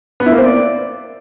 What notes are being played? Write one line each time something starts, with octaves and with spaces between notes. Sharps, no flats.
B3
E4
A#3
C4
D5